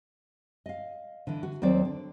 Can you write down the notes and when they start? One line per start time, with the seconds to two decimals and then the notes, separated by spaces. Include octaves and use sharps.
0.66 D#5 F5
1.27 D3 E3
1.43 F#4
1.62 D#2 F#3 C4 D5
1.85 D3